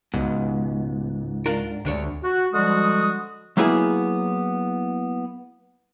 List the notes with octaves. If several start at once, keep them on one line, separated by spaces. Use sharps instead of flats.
C#2 G#2 B2
D4 F4 A#4
D2 C3 D4 C#5
F#4
D3 F3 G3 G#3 F#4 D#6
F#3 A#3 B3 E4 G#4